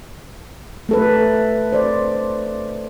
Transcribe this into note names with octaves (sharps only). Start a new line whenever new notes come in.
A3 A4 B4
C5 D5